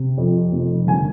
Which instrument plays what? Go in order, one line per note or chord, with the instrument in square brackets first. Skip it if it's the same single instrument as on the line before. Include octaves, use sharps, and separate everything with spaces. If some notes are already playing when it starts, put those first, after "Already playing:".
Already playing: [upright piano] C3
F2
F1
G1 G#5